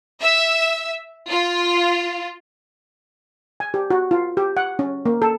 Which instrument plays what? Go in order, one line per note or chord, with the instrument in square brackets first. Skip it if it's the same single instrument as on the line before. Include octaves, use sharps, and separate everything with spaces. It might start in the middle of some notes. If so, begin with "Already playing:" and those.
[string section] E5
F4
[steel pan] G#5
G4
F#4
F4
G4
F#5
C#4
A#3
A4